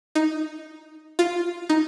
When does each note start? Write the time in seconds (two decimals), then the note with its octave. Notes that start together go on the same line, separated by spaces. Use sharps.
0.15 D#4
1.19 F4
1.70 D#4